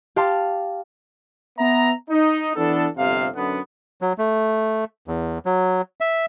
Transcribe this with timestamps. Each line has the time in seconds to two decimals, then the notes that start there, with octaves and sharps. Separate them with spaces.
0.16 G4 F5 A5 C6
1.58 B3 E5 A#5
2.10 D#4
2.56 E3 B3 D4 A4
2.97 G1 F2 C3 F5
3.35 F#2 D3 B3
4.02 F#3
4.18 A3
5.08 E2
5.45 F#3
6.01 E5